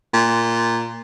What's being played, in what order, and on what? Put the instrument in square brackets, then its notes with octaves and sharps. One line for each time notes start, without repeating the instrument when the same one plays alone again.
[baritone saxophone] A#2